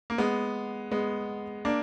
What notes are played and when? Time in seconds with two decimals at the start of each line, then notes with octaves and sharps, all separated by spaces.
0.10 A#3
0.18 G#3 B3
0.91 G#3 B3
1.65 A#3 D4